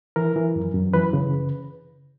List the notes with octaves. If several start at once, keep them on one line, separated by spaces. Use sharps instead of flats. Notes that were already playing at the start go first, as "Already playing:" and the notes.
E3 A#4
E3
F#2
F#2
E3 B4
C#3